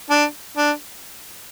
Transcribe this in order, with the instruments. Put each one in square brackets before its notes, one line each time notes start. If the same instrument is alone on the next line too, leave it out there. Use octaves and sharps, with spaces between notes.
[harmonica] D4
D4